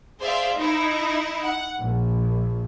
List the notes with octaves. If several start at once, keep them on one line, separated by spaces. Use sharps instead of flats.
G#4 C5 D5 E5 F5
D#4 E4
F#5
A#1